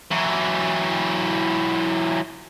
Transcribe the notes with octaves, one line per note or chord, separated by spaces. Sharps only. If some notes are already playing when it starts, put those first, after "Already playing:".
E3 F#3